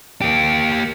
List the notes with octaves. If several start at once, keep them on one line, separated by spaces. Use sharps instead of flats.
A#3 G4